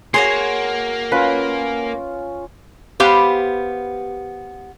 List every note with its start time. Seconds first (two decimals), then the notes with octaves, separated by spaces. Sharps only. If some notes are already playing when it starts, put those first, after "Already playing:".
0.14 A#3 F#4 G#4 C#5 C6
1.12 C#4 F4 B4
3.00 B3 G4 C5 F5